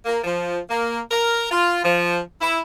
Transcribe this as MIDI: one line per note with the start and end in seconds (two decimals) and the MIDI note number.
0.06 0.20 58
0.24 0.58 53
0.69 0.99 58
1.11 1.49 70
1.51 1.82 65
1.83 2.19 53
2.40 2.58 64